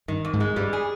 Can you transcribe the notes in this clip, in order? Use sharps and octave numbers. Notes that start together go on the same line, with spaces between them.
G2 D#3
F2
G#2
G#3
G2 G3
G#4